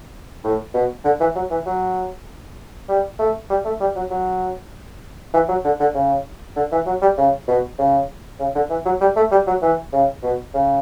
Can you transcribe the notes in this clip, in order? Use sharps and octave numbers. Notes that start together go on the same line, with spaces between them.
A2
B2
D3
E3
F#3
E3
F#3
G3
A3
G3
A3
G3
F#3
F#3
E3
F#3
D3
D3
C#3
D3
E3
F#3
G3
C#3
B2
C#3
C#3
D3
E3
F#3
G3
A3
G3
F#3
E3
C#3
B2
C#3